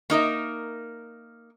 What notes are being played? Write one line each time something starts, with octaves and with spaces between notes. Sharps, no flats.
A#3 D#4 A#4 E5